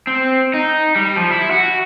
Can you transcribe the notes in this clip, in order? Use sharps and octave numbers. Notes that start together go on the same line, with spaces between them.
C4
D#4
G3
F3
E4
F#4